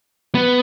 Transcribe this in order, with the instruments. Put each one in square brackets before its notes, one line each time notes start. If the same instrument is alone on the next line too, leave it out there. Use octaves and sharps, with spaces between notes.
[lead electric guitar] B3